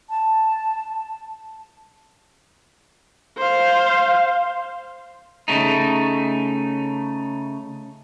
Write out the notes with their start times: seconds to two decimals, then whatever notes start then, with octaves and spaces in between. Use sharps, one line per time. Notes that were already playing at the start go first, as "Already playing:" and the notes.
0.10 A5
3.38 C5 F5
5.48 C#3 A3 D#4